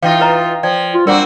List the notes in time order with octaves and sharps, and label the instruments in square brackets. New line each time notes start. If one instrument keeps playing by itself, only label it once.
[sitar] E3 D#4 F4 [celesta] F5 G5 A#6
[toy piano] B4 D#5 A#5
[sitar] F3 [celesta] D5 G5 G#6
[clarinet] F4
[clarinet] G3 [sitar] A#3 C4 F#4 [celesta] D4 [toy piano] A#4 F#5